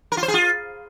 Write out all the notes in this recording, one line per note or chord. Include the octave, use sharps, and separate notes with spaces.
A#4
F4
C5
G#4
F4